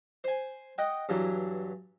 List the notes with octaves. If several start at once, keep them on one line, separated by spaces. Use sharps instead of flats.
C5 G#5
D#5 F#5 G5
G2 E3 F#3